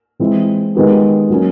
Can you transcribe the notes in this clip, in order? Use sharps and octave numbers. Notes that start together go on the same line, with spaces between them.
E3 G#3 C4 E4
D#3 G#3 B3 D#4 G4
F#3 A#3 C#4